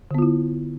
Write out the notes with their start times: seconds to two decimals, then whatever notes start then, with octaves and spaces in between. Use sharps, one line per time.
0.11 D3
0.15 B3
0.18 F4
0.22 E4